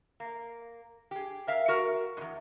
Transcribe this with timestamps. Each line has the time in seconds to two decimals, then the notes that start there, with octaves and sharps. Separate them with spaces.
0.20 A#3
1.11 G4 G#4
1.47 A#4 E5 F5
1.68 F#4 A#4
2.17 E2 G#2